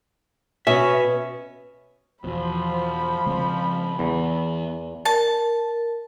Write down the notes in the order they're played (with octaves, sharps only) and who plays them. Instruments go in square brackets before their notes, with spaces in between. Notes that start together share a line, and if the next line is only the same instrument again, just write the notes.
[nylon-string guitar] B2 [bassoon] C#4 [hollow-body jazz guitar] E5
[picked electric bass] E2 B2 [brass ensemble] F3 [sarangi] B5
[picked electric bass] C#3 G#3 C4
[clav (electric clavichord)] E2 [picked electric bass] E3 B3
[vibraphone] A#4 [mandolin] A5